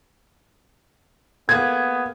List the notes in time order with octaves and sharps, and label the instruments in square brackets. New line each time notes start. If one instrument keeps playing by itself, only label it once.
[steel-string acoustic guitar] A#3 G#4 [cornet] B3 [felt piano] G#6